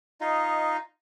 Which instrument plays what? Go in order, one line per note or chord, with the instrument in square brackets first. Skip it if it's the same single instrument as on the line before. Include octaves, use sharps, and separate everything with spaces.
[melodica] D#4 F4 D#5